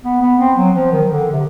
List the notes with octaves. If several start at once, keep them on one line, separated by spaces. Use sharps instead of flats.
B3
B3
C4
F#3
F3
D#3
D3
C3